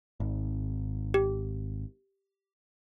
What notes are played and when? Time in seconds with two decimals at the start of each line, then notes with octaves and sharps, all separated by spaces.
0.20 G#1
1.14 G4